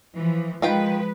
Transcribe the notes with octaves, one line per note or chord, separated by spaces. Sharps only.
E3 F3
D#3 F3 G#3 F4 B4 G5